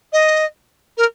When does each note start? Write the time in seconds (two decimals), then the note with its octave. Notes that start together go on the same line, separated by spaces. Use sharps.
0.13 D#5
0.97 A#4